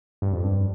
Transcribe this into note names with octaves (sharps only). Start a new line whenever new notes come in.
G2
F2
G2